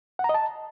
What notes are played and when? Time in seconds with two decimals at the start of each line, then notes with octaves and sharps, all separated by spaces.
0.19 F#5
0.24 A#5
0.29 D#5
0.34 A5